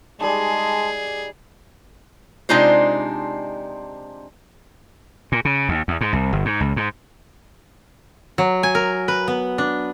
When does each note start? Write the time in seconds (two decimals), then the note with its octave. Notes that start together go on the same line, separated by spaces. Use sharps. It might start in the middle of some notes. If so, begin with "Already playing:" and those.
0.21 G3 G#3 D#4 G#4 A5
2.49 C3 G#3 D4 D#4 F4 C5
5.32 A#2
5.45 C#3
5.69 D#2
5.88 E2
6.01 G#2
6.13 C2
6.33 G1
6.45 G#2
6.61 C#2
6.76 G#2
8.38 F#3
8.63 G#5
8.75 A#4
9.08 B4
9.28 B3
9.58 D4